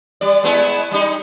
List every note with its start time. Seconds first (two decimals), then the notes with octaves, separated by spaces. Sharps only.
0.21 G3 D5
0.43 G#3 B3 E4
0.91 G3 D#4